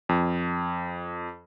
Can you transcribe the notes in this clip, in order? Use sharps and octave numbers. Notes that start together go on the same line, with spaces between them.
F2